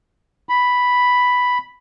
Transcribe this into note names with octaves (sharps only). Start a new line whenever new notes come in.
B5